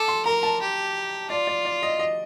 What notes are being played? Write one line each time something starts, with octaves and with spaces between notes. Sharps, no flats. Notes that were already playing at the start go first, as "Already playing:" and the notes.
Already playing: A4 D6
C6
A#4 A#5
A5
G4
F4 D5
D5
D5
D#5
D#5